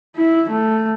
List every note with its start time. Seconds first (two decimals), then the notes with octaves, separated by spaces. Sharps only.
0.16 E4
0.49 A3